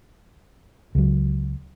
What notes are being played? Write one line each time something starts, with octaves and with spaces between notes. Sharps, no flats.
C#2 F#3